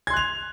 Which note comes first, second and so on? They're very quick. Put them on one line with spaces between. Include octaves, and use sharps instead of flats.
G#6 C6 F#6 F7